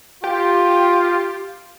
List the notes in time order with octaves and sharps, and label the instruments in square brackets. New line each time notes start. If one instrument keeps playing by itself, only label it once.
[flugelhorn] F4 [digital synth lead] G4